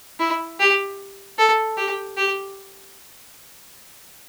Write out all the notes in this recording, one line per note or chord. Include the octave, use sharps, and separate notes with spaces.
E4
G4
A4
G4
G4